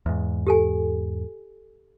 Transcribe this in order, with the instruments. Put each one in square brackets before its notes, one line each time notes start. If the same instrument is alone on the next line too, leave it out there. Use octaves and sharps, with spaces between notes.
[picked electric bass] E2 G#2
[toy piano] G4 A4 G#5